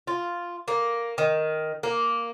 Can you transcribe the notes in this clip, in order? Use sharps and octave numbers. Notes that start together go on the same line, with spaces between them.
F4
A#3
D#3
A#3